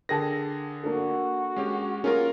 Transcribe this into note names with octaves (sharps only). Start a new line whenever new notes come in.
D3 G#4 A#4 G5 A5 A#6
A#3 D4 F#4 A4
G#3 C#4 G4
A#3 C#4 F4 G#4 A#4